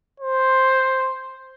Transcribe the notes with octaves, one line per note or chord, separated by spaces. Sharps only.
C5